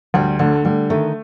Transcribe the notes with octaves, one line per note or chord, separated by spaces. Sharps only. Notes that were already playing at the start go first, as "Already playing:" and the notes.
D2 G3
D3 A3
D3 G3
D#3 A3